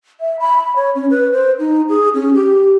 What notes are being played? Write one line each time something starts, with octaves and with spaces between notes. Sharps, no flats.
E5
B5
B5
C#5
C#4
B4
C5
D#4
G#4
C#4
G4